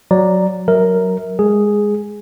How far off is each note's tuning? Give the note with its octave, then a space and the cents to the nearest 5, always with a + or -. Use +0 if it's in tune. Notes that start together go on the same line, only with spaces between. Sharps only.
F#3 -5 D5 +0 A#5 +0
F#3 +0 A#4 +0 E5 -25
G#3 -15 G#4 +0